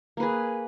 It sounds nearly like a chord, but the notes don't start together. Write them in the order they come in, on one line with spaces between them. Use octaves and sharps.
A#3 B4 G#4